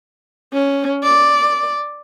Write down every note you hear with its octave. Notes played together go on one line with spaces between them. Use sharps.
C#4
D5